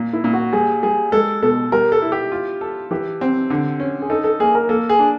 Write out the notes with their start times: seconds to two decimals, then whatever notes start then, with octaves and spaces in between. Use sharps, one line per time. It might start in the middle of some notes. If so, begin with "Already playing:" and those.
Already playing: A#2
0.13 E4
0.24 A#2
0.33 F#4
0.53 G3 G#4
0.83 G3 G#4
1.12 G#3 A4
1.43 B2 A4
1.72 G3 A#4
1.92 A4
2.02 E4
2.12 G4
2.32 F4
2.61 A4
2.91 E3 G4
3.21 C4
3.50 D3
3.80 C#4
4.02 G#4
4.10 D#4 A4
4.24 A4
4.40 A#3 G#4
4.55 A#4
4.69 A#3 A4
4.89 G#4
4.99 D4